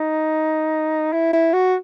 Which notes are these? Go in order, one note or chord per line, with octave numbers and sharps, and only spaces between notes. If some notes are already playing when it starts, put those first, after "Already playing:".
Already playing: D#4
E4
E4
F#4